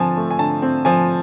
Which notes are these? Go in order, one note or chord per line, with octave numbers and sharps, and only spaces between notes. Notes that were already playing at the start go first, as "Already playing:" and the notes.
Already playing: D3 F3 C4 G#5 A5
A3
G#5
D3 A5
C4
F3 G#5